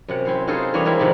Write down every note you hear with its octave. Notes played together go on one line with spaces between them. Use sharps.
F#2 C3 F#5
C4 E4 C5
D#4 F4 F#4 G#4 A4 C5
E3 G3 A#3 C#4 D4 C#5
G#3 A#3 C4 E4 F#4
F2 C3 D#3 D5